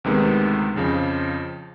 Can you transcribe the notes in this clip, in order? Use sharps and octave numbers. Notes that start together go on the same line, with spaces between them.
D2 C3 D#3 G#3 B3
F2 C#3 F3